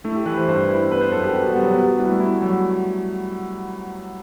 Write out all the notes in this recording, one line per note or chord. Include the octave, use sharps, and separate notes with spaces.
A3 E4
G4
E3 B4
C5
G2 C5
E4
B3 B4
C5
F#2 A4
G4
B3 F#4
G3
B3
F#3
B3
F#4
G3 E4
A3
E4
F#3